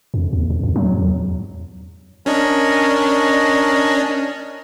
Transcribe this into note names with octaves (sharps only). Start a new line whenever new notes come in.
F2
D#2
E2
F#2
F#3
E2
C#4 D4 A#4 D#5 C#6